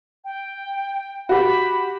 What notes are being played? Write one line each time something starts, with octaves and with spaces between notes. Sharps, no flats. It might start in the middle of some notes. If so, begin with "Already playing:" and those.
G5
F#4 G4 B5